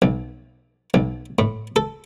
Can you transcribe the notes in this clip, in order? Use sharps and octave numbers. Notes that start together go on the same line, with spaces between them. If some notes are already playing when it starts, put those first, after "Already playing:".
B1
B1
A2
A4